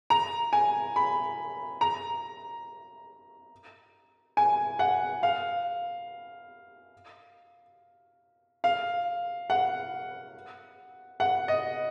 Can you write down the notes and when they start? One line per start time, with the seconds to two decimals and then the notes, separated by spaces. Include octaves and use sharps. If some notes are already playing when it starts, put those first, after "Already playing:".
0.10 A#5
0.53 G#5
0.96 B5
1.81 A#5
4.37 G#5
4.79 F#5
5.23 F5
8.64 F5
9.50 F#5
11.20 F#5
11.48 D#5